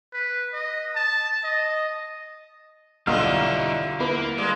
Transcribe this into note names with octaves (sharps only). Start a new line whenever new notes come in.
B4
D#5
A5
D#5
B1 D3 G3 D4 E4 F4 F6
A#3 B3 E4
G3 G#3 A#3